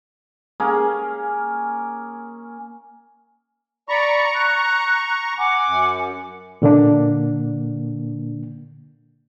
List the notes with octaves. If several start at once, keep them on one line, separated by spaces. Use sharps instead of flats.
A#3 C#4 G#4
D5 A#5 B5 C#6
F#6
F#5 G#5 D6
F#2
A#2 D3 A#3 D4